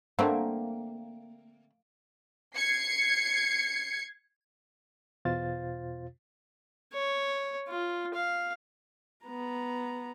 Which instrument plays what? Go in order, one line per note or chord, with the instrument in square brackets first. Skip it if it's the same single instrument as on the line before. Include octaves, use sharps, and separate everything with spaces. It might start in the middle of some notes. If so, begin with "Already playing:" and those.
[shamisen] D3 A3 C4 [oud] A#3
[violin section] G#6 C7 C#7
[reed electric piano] E2 B2 F4 C5 F5 A6
[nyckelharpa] C#5
F4
F5
[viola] B3 A#5